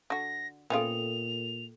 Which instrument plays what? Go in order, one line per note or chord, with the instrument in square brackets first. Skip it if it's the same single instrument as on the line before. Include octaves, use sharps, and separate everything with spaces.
[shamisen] D3 F#4 [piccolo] A#6
[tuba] A#2 [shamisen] B3 C#4 F4 [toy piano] A4 E5 G5 [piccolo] F7